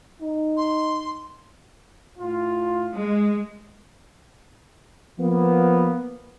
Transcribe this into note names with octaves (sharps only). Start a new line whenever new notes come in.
D#4
C6
A2 F4
G#3
F3 A#3 B3